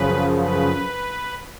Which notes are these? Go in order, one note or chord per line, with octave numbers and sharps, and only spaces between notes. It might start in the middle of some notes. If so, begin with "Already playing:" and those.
Already playing: F#2 C#3 F3 B4
B4